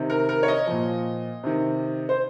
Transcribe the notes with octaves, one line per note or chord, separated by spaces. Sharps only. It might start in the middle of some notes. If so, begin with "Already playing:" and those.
Already playing: C3 D#3
A#4
A#4
C#5
D#5
A#2 F3
C3 D#3
C5